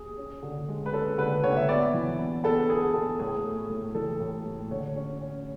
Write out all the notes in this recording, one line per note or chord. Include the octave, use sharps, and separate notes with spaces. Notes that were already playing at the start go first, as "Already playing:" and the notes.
Already playing: G#4
C#4
D3
G#3
B4
C#4 A4
D3 B4
D3 C#5
E5
B3 D5
E3
B3
B3 A4
B3 G#4
B3 A4
A2 G#4
A3
A2
E3 A4
A2
A2
D3 C#5
C#4
C#4